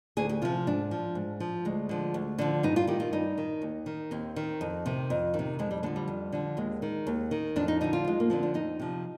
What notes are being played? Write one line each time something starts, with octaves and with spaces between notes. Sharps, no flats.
D2 G#4
G4
C3 F3 F4
G#2 D4
F3
G#2
F3
D2 G#3
D3 F3
D2
D3 F3
G2 D#4
F4
D#3 G4
F4
G2 D#4
D#3
D#2
D#3
D#2 C4
D#3
F2
C3 D#3
F2
D#3
C3
F2 G#3
G3
D3 F3 G#3
G3
F2
D3 F3
D#2 G#3
D#3
D#2
D#3
F2 D4
D#4
D3 F3 D#4
F4
F2 G#3
A#3
D3 F3 C4
D4
F2 D#4
C3 F3